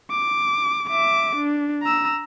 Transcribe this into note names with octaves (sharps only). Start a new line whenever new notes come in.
D6
E5 D6
D4
A#5 E6